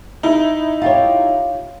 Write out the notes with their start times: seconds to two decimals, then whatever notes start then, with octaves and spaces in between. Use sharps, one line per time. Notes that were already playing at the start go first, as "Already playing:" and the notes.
0.23 D#4 E4
0.82 F4 G4 C#5